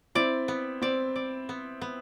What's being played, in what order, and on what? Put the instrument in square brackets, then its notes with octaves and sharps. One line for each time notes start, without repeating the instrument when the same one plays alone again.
[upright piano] C4 E4 [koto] D5
[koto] B3
[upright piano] C4 [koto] D5
[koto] D5
B3
B3